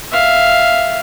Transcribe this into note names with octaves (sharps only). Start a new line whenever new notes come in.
E5 F5